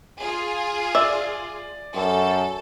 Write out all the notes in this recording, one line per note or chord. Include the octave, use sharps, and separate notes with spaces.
F4 G#4
D5 E5
F#2 A4